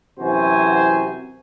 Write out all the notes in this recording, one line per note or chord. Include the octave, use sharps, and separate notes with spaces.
F#2 C3 E3 F#4 C5 G#5